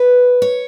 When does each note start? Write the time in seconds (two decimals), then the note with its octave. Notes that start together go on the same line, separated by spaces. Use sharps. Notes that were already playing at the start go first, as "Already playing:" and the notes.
Already playing: B4
0.42 C#5